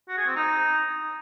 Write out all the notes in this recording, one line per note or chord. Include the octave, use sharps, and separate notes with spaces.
F#4
G#4
C4
D#4